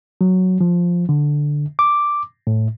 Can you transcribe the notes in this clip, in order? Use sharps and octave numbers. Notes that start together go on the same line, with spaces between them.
F#3
F3
D3
D6
A2